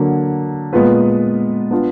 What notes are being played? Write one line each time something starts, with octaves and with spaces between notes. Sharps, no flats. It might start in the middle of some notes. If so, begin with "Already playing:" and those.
Already playing: D3 F#3 A#3
A#2 G#3 B3 F4 B4
B3 D4 F4